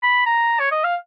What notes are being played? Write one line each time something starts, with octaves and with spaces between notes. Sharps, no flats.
B5
A#5
C#5
D#5
F5